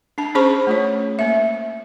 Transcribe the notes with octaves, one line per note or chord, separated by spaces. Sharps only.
D4 A5
C#4 G#4 C5 A5 B5 C#6
A3 F4 C#5
A#3 E5